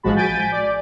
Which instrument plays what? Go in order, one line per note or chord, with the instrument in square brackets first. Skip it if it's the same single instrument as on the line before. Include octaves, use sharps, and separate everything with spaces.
[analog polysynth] A1 F3 G#3 F#4 A5 B5
G#5 G6 A6 B6 D7 D#7
D5